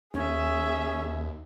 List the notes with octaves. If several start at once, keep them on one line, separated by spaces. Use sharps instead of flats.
D#2 C#4 G#4 E5